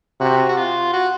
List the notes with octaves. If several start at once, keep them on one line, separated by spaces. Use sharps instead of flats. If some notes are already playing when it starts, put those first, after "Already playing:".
C3 F#4
F#4
F4
F#4